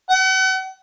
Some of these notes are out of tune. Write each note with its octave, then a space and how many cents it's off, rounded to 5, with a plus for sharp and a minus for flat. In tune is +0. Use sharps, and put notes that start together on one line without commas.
F#5 +40